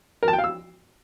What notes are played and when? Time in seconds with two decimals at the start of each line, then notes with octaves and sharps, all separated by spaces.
0.23 A#4
0.28 A5
0.33 G5
0.38 F5
0.44 E6